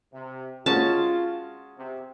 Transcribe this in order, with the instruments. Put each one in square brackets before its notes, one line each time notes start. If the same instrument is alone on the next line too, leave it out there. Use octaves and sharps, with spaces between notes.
[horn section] C3
[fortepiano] G#3 C#4 F#4 [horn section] F4 [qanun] A5
[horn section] C3